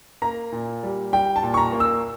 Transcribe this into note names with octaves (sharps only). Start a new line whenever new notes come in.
A#3 A#5
A#2
G3
G3 G5
A5
A#2
C#6
A#5
A#3
E6